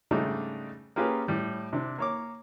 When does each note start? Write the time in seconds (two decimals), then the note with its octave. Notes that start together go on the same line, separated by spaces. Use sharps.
0.11 G#2 C#3 G3 A3 D4 D#4
0.96 A#3 C#4 F4 G4 G#4 B4
1.28 A2 G3
1.73 C3 D4
1.98 A#3 C#5 D6